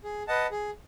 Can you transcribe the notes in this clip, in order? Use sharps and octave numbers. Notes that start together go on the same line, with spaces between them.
G#4
B4 D#5 F#5 A5
G#4